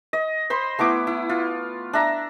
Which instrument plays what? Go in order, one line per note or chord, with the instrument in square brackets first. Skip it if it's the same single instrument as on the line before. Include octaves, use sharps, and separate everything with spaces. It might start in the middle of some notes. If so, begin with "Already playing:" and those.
[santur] D#5
C5 B5 C6
A3 B3 E4 D6
E4
F4
D4 E5 A#5